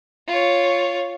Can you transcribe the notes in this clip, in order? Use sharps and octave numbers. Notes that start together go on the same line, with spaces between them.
F4 C#5